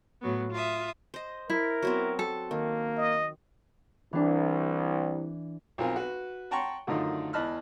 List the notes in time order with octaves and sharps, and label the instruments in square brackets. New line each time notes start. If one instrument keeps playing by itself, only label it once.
[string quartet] A2 F#3 B3
F4 E5 D#6
[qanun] C5 D#5
[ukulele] E4 [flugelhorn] A#4
[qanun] F#3 B3 C4
[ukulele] A4
[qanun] D#3 [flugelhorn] A#3
[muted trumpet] D#5
[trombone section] C2 [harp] E3 D4
[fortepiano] B1 F3 C4 A#4 F5 G#5
F#4 B4
F#5 G5 A5 A#5 C6 C#6
F#2 D3 D#3 A3 D#4 F4
E2 D#5 A5 B5 F6 F#6